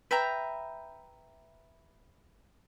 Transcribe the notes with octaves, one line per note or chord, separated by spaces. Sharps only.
B4 E5 G5 A#5